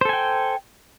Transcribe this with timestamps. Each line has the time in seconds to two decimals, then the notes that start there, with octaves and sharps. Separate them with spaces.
0.01 C5
0.05 A4
0.09 G#5
0.13 G5